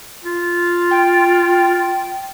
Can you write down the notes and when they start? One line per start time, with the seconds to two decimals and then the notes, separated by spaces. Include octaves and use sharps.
0.24 F4
0.91 G5